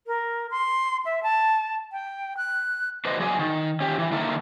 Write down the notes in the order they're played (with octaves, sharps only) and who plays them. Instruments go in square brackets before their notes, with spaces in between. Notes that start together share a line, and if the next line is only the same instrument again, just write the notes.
[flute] A#4
C6
E5
A5
G5
F#6
[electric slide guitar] D4 B4 C5 D#5
F#3 G#4 D5 E5 G#5
D#3
C#4 G4
E3
D3 D#3 A#3 E4 A4 A#4